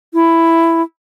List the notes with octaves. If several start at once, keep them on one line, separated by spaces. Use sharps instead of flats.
E4